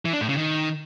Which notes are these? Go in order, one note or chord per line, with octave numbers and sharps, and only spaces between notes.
E3
D4
A2
C#3
D#3